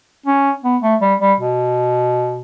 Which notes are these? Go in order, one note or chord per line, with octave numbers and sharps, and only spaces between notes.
C#4
B3
A3
G3
G3
B2